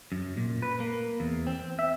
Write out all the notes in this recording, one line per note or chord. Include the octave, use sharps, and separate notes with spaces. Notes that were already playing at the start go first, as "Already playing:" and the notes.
F#2
A#2
B4
A#3
E2
C4
E5